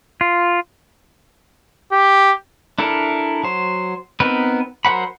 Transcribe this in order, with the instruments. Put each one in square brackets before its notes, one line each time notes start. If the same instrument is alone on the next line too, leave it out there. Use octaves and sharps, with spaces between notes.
[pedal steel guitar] F4
[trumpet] G4
[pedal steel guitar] D4 E4 A4 A#4
F#3 C5
B3 C4 D#4 A#4 B4
F#3 A#4 C5 F#5 B5